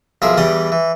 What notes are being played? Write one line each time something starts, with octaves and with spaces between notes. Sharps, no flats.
B1 F3 G#4 A#4 E5
E2 E3 G3 G4 D5 D#6
E3